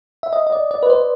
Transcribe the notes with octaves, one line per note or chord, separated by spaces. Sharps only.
E5
D#5
D#5
D5
D5
B4
C5